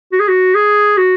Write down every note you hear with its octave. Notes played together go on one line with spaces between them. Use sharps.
F#4
G#4
F#4
G#4
F#4